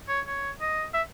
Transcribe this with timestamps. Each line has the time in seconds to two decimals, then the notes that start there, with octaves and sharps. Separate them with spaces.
0.09 C#5
0.27 C#5
0.61 D#5
0.94 E5